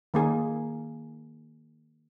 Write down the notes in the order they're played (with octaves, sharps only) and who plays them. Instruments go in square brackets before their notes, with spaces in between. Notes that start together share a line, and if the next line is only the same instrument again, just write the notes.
[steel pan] D#3 A#3 G#4